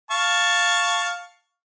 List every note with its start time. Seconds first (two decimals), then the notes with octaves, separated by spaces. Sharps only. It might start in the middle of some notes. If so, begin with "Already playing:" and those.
0.11 F5 A5 C#6